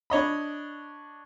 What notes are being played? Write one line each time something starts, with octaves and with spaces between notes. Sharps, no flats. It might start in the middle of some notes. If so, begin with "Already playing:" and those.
D4 C#5 D#5 B5